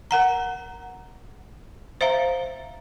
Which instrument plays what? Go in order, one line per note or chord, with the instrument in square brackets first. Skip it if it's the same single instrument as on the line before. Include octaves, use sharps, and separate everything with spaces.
[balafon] A#4 F#5 A#5
C5 E5 F5 A#5